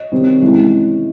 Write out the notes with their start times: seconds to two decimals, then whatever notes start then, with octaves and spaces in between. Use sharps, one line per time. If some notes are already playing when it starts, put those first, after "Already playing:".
Already playing: C#5 D#5
0.12 C3 D#3 G3 C4
0.41 C3 E3 G#3 C#4